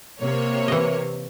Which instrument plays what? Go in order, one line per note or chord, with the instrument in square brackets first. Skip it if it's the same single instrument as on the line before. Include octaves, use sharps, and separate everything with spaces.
[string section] C3 A#3 C#5
[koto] E3 D#5